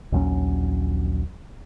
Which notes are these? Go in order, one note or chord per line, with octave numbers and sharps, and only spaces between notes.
A#1 D#2 F#3 C#4